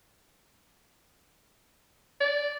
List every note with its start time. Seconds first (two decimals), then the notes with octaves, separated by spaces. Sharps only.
2.21 D5